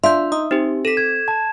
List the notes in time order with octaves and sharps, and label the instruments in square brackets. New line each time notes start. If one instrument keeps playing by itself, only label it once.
[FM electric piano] D4 F4 [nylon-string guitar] E5 [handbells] C6 G6
[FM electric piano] D#4 [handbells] D#6
[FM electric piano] C4 [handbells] D#4 G4
[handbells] A4 B6 [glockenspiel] E7
[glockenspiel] G#6
A5